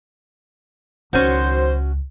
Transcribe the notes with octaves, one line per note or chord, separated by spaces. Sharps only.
C#2 D#3 F#3 C#4 F#4 C5